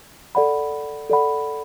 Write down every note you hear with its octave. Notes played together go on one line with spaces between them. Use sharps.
A4 D5 F#5 B5
A4 D5 F#5 B5